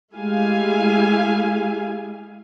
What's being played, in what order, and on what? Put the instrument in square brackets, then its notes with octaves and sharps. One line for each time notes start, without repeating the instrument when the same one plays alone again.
[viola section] G#3 A3 E4 G4 F5 G#5